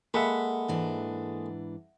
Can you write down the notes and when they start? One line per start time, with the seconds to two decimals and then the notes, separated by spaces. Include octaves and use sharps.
0.14 G#3 A#3 A4 E5 F#5 B5
0.68 G#2 E3 D4